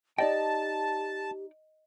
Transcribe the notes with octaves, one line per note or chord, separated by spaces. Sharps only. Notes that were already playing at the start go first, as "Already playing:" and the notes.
D#4 G4 D5 D#5 G5 A5